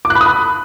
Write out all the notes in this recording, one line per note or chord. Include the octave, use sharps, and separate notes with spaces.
D6
F#6
B5
D#6
B5